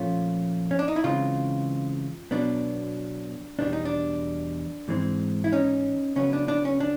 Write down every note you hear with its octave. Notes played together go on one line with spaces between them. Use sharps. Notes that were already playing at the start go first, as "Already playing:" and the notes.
Already playing: A#2 F3 A3 C#4 F4
C#4
D4
D#4
E4
C#3 E3 G#3 C4 D#4 F4
B2 F#3 B3 D4
E2 B2 G3 B3 D4
D#4
D4
G#2 E3 G#3 C4
E4
C#4 D#4
C#3 F#3 B3 C#4
D4
D4
C#4
D4